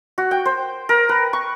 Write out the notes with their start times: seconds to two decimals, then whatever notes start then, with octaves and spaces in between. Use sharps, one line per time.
0.18 F#4
0.31 G5
0.45 C5
0.89 A#4
1.09 B4
1.33 C#6